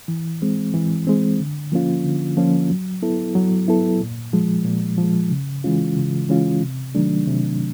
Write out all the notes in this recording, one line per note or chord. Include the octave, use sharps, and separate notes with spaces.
E3
G#3 C4
E3
G#3 C4
D3
F3 A#3 C#4 F4
D3
F3 A#3 C#4 F4
F#3
B3 E4 A4
F#3
B3 E4 A4
A#2
F3 G#3
A#2
F3
G#3
C#3
E3 G#3 C#4 F4
C#3
E3 G#3 C#4 F4
C3
D#3 F#3 A3 D4
C3